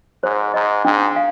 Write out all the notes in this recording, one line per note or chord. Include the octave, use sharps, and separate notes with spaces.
G#2 C5
G#2 D#5 A#5
G#2 D4
F5 G#5